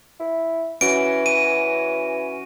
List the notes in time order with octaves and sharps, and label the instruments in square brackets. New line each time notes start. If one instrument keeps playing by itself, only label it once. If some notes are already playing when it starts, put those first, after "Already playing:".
[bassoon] E4
[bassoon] E3 [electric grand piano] C#4 F#4 [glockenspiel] D7
[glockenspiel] D#7